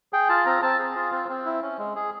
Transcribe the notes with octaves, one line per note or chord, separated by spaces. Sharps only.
G#4 G5
F4 A5
C4 A#5
C4 A5
G#4
F4
C4
C4
E4
C#4
G#3
G#4